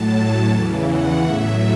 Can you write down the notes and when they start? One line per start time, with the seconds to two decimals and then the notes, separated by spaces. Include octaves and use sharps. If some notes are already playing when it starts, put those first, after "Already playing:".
Already playing: A2 F#3 A5
0.12 A5
0.49 E2 C#3 E3
0.85 F#5
1.23 A2 F#3 E5